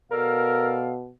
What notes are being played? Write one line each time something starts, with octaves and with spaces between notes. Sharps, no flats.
B2 A4 A#4 D5 F5